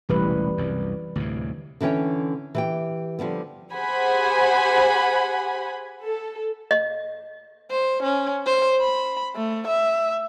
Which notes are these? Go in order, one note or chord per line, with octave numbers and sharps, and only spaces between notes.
E1 A1 C3 E3 G3 B4
C2 F#2
D2 A2 C3
D3 E3 C#4 C#5 G5
E3 G4 G5
D3 F3 G3 B3
G4 G#4 C5 F#5 G#5 B5
A4
D#5
C5
C#4
C5
B5
A3
E5